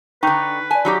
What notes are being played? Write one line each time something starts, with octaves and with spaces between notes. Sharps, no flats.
D3 D#4 B4 G5 C#6
D5 G#5 A5
F#3 D#4 G4